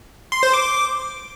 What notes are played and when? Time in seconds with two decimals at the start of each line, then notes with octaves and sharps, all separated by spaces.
0.32 C6
0.43 C5
0.54 D6